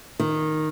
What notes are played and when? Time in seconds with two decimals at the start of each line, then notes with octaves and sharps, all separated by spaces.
0.20 D#3